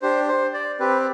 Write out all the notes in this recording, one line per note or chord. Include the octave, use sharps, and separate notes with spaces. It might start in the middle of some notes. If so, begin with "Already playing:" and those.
D4 G4 C5
C5
D5
C4 G4 B4